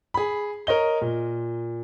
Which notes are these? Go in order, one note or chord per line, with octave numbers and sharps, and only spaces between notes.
G#4 B5
A#4 C#5 D#5 G7
A#2